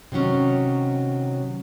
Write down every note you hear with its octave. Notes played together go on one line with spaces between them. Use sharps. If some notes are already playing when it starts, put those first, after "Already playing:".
C3 D#3 F#3 C#4